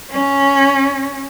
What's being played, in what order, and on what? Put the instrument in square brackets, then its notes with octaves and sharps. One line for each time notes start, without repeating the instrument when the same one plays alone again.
[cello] C#4